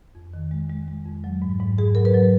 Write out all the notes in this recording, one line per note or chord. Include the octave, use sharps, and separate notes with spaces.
F2
D#3
G#3
G#3
G#3
F2
F#3
G#2
G#2
G#2 G#4
F#3 A#4
B4
F#3